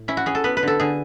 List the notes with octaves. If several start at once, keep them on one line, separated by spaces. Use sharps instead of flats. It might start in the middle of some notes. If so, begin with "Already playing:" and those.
Already playing: A2
C#4 E4
F#4
C#4 G#4
A4
B3 B4
B4
D3 A4
D3 G#4